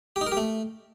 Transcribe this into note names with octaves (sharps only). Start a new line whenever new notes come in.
G4
D#4
A#4
G4
A3